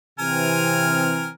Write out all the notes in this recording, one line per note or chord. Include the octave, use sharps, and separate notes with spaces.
C3 E3 C4 A#4 G#5 F6